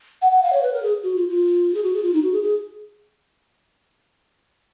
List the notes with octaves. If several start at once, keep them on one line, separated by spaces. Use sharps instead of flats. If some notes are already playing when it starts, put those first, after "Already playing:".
F#5
F#5
F5
C#5
B4
A#4
G#4
F#4
F4
F4
G#4
F#4
G#4
F4
D#4
F#4
G#4
G#4